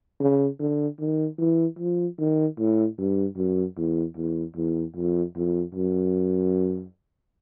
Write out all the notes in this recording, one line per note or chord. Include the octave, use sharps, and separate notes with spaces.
C#3
D3
D#3
E3
F3
D#3
A2
G2
F#2
E2
E2
E2
F2
F2
F#2